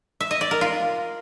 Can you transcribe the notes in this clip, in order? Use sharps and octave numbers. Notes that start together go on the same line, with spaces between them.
E5
D#5
D5
A#4
F4